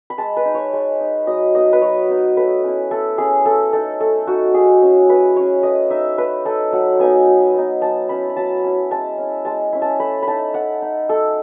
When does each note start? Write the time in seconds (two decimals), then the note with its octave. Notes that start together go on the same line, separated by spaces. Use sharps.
0.10 B5
0.18 G#3 A5
0.37 B4
0.45 D#4
0.54 C#5
0.73 G#3
1.00 D#4
1.27 F#3 D#5
1.55 B3 D#4 D#5
1.73 B4
1.81 F#3 C#5
2.09 B3 D#4
2.37 A3 B4
2.64 C#4 E4
2.91 A3 A4
3.18 C#4 E4 G#4
3.45 A3 A4
3.73 D#4 A4
4.00 A3 A4
4.27 D#4 F#4
4.54 G#3 G#4
4.82 C#4 E4
5.09 G#3 B4
5.36 C#4 E4 C#5
5.63 A3 D#5
5.90 D#4 E5
6.18 A3 B4
6.45 D#4 A4
6.72 F#3 F#5
6.99 B3 D#4 G#5
7.27 F#3
7.54 B3 D#4
7.82 F#3 A5
8.09 C#4 E4 B5
8.30 B5
8.36 F#3 A5
8.64 C#4 E4
8.91 G#3 A5
9.18 C#4 E4
9.45 G#3 A5
9.73 C#4 E4
9.82 A5
10.00 A3 B5
10.22 B5
10.28 D#4 A5
10.54 A3 F#5
10.82 D#4
11.09 A3 A4